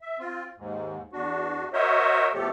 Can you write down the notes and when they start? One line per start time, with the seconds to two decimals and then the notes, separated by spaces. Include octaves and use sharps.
0.01 E5
0.19 C4 F4
0.57 D#2 G#2
1.13 E2 D4 F#4
1.73 F#4 A#4 C5 C#5 D#5 E5
2.34 F2 B2 F3 A3 G4 A4